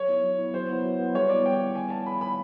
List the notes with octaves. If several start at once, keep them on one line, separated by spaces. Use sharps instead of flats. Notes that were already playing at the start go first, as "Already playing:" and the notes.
Already playing: F#3 C#5
B3 E4
F#3
B3 E4
F#3 C5
B3 E4
F#3
B3 E4
G3 C#5
B3 E4 D5
G3 G5
B3 E4
G3 G#5
B3 E4 A5
G3 B5
B3 E4 B5